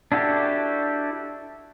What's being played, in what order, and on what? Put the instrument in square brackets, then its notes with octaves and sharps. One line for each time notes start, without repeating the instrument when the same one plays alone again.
[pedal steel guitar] D4 E4 F#4 G4 A4